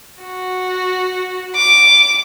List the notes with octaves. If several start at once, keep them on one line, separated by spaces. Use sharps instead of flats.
F#4
D6